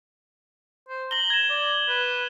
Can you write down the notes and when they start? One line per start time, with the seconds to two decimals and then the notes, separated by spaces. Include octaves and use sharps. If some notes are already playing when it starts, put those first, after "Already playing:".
0.89 C5
1.11 A#5 F#7 G7
1.30 G#6 E7
1.50 D5
1.88 B4